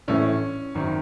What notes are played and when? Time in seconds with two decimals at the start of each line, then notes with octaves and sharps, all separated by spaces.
0.08 A#1 A2 E3 C#4
0.75 G#1 F#2 D#3